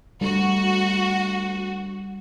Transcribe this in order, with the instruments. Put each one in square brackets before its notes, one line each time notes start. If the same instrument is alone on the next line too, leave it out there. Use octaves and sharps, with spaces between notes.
[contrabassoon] D2 [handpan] G3 [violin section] F#4